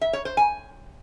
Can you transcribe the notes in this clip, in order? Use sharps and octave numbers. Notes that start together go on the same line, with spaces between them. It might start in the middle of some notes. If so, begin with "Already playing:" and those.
E5
C#5
C5
G#5